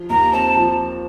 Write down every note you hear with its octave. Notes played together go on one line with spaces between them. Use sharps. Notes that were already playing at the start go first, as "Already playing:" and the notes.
Already playing: F3
D#2 A#5
C4 A5
F3